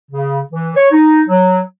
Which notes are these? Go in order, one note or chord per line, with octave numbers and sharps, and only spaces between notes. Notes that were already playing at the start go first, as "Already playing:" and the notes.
C#3
E3
C#5
D#4
F#3